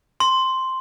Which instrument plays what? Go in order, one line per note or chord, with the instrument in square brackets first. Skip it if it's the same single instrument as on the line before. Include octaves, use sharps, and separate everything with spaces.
[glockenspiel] C6